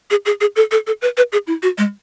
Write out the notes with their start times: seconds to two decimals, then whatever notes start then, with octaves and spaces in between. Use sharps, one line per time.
0.11 G#4
0.26 G#4
0.41 G#4
0.56 A4
0.71 A4
0.87 A4
1.02 B4
1.17 B4
1.32 G#4
1.47 E4
1.63 F#4
1.78 G#3